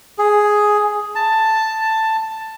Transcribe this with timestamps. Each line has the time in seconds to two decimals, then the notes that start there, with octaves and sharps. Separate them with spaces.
0.19 G#4
1.15 A5